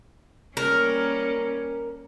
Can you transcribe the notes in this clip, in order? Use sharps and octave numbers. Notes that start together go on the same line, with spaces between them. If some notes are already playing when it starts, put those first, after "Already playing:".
G3 A#3 C#4 A#4